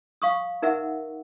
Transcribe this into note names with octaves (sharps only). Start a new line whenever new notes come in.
F5 C#6 D#6
D#4 A#4 E5 F#5